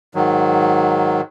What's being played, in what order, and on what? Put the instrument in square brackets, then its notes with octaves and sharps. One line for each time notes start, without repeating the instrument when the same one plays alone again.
[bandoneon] G#2 D#3 F#3